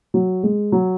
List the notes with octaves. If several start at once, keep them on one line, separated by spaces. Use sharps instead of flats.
F#3
G#3
F#3